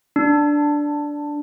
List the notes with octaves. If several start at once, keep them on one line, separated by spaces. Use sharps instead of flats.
D4